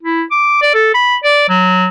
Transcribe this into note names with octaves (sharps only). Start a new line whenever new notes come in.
E4
D6
D5
A4
B5
D5
F#3